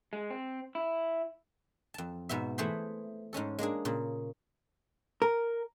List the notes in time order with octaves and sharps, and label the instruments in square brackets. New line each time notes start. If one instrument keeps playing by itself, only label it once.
[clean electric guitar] G#3
C4
E4
[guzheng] F2 A5
G#2 B2 B3 E5
E3 A3 G#4 C5 B5
G#2 G#3 C#4 A4
G#3 A#3 D4 G#4
A#2 C#3
[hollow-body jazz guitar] A#4